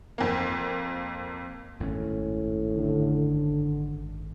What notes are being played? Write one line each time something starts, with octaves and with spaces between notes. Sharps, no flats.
F2 A#3
G#1 F#2 A2 C#4
D3